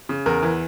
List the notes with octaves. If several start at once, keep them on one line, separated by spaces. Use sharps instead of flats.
C#3
E2 A#4
E3